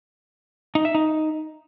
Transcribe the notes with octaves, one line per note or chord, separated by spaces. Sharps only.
D#4
E5
D#4